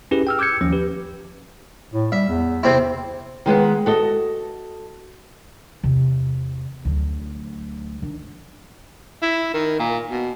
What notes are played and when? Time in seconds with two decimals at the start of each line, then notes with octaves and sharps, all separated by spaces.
0.11 C#4 E4 G4 G#4 B4
0.27 G5 E6 F6
0.39 D6 E6 G6 G#6 C#7
0.61 D#2 F3 C#4
0.73 G4 B4
1.94 A2
2.12 G3 E5
2.28 E2
2.63 C3 C4 E4
3.46 D#3 G#3 B3 F#5
3.86 F#4 A4 D#5
5.83 E2 C3
6.85 D2 F#3
8.02 D#3 D4
9.22 E4
9.53 D#3
9.79 A#2
10.10 B2